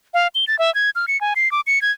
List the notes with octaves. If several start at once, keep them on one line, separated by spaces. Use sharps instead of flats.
F5
G7
A6
E5
G#6
F6
C#7
G#5
C7
D6
C#7
G#6